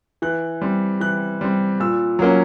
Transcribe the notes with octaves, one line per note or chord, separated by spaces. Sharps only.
E3 F#6
G3 C4
E3 F#6
G3 C4
A#2 E6
F#3 A#3 C#4